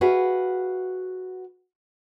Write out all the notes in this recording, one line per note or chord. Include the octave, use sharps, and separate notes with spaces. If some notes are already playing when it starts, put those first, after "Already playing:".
F#4 G#4 B4 E5 F5